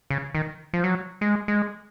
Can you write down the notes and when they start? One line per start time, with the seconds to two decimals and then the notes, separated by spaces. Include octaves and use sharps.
0.10 C#3
0.35 D#3
0.73 F3
0.84 F#3
1.21 G#3
1.48 G#3